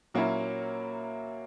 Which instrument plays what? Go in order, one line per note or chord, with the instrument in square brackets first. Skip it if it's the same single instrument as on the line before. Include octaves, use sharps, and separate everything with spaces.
[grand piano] A#2 F#3 A#3 C#4 E4